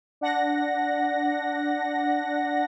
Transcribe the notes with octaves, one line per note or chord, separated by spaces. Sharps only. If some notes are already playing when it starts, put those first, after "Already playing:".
D4 F#5 A#6